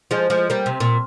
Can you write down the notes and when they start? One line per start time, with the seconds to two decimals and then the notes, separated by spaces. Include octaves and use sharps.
0.11 F3 G#3
0.30 F3 G#3
0.50 G3 A#3
0.66 C3
0.80 A#2